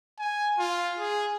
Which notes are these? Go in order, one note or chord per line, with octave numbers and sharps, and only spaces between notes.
G#5
F4
G#4